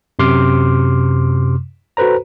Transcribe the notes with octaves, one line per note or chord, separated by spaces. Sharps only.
F#2 C3 C6 D6 F6
F#4 A4 B4 C5 A#5